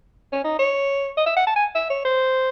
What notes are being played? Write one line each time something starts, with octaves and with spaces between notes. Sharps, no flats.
C#4
D#4
C#5
D#5
E5
F#5
A5
G#5
E5
C#5
C5